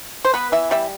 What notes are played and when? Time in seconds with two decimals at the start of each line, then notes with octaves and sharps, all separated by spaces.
0.25 C5
0.34 B3 B4
0.52 E3 E5
0.71 G3 E5